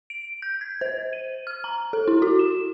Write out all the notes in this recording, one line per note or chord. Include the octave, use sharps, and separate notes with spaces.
D7
G6
G#6
C5
D#7
F6
A#5
A4
E4
F#4
E7